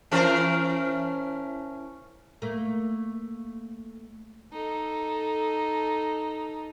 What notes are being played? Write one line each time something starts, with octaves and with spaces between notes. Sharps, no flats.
E3 C#4 A#4
A3 A#3
D#4 A4